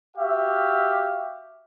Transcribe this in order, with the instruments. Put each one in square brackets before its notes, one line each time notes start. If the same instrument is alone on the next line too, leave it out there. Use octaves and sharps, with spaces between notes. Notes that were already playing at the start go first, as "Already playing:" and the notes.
[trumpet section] F#4 G4 E5 F5